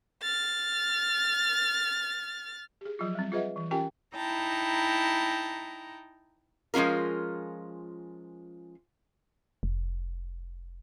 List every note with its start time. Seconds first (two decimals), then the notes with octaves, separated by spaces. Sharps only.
0.23 F6 A6
2.81 G4 G#4
2.99 F3 F#3 F4
3.15 G3 C4
3.32 F4 G#4 B4 D#5 E5 F#5
3.56 E3
3.71 C#4 F4 G4 A#4 G5 G#5
4.14 D#4 E4 G5 A5 A#5
6.74 F3 G#3 C#4 F4 A#4
9.63 F1